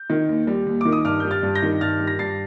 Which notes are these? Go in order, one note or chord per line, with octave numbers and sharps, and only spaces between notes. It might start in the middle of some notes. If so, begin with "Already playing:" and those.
Already playing: G6
D#3
D#2
G3
D#2
D#3 D6
D#6
G2 D6 F6
G3 G6
F6 A6
G2
G6 A#6
D#3
G2 F6 A6
G3
A#6
G2 A6 C7